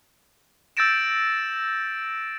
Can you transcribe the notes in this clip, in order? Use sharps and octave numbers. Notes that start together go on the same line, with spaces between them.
E6 G6 A6 A#6 D7 E7